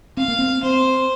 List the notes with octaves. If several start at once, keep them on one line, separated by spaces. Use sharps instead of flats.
C4 F5
A#3
C4
C4 C5